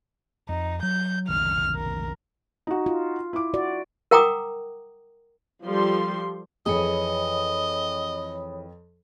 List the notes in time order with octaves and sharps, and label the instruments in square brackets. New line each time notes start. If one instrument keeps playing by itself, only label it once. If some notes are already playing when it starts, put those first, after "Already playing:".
[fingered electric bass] F2 [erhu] D#4
[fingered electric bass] F#3 [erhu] G6
[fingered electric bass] F1 B1 D#3 [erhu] F6
[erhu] A#4
[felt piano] D#4 F#4
[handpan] F4
[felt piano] E4 D6
[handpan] F#4 D5
[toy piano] A#4 F#5 G5 A#5 D6 D#6
[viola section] F3 G3 A4 C6
[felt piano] F2 [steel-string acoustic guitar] E3 G#4 [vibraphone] C#5 B5 D#6 [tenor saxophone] D#5